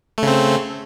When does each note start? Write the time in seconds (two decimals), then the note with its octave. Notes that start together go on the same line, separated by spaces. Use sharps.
0.18 A3
0.23 C#3
0.27 C4